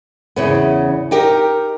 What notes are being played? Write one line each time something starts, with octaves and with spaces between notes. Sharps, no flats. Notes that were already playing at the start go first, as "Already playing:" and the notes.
E2 C#3 B3
D#4 G4 A#4